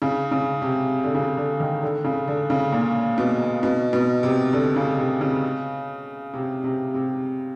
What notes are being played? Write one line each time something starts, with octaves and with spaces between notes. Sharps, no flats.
C#3
C#3
C3
D3
C#3
D3
D#3
D3
C#3
D3
C#3
A#2
B2
B2
B2
C3
D3
C#3
C3
C#3
C3
C3
C3